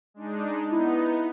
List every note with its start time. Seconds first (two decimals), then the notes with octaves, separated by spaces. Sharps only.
0.14 G#3 D4 D#4
0.72 B3 D#4 E4